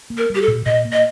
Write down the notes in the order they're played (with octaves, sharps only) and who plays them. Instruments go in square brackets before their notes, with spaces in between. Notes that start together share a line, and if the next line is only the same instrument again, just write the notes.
[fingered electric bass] A#3
[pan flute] A#4
[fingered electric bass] G3
[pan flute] G4
A4
[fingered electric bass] A#2
[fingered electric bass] A#2 [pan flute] D#5
[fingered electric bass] A#3
[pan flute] D#5